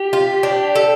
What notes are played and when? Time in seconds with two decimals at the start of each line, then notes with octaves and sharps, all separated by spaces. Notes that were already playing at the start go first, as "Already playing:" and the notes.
Already playing: G4
0.13 F4
0.43 D4
0.75 A4